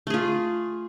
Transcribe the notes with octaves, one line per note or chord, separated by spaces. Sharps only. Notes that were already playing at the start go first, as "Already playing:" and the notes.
A3 F4 G#4